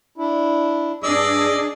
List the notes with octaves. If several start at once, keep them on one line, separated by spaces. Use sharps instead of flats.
D4 E4
G2 D4 G#4 D5 D#5 E6